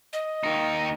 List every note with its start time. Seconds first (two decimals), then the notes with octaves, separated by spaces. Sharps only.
0.13 D#5
0.43 D#2 D#4